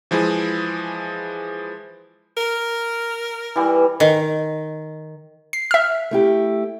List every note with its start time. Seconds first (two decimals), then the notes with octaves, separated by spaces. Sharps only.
0.11 E3 F3 G#3 E4 G#4
2.37 A#4
3.56 E3 G3
4.00 D#3
5.53 C7
5.71 E5 F6
6.11 A3 E4 G4